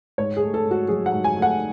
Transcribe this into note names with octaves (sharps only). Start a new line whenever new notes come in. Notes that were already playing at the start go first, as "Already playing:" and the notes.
G#2 C#5
G#4
A3
A4
G#2
F#4
F#3 G#4
F#5
G#2
G#5
A3
F#5